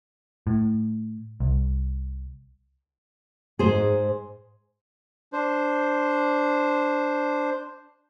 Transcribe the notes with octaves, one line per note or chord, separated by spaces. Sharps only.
A2
C2
G#2 G#4 C5
D4 C5